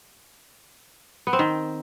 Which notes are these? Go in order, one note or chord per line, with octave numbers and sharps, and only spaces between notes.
B3
C4
D#3